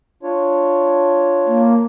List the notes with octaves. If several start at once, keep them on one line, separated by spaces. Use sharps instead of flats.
D4 F4 C#5
A#3